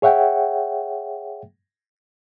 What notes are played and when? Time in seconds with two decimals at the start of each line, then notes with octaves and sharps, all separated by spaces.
0.02 G#4 C#5 E5 F#5 G5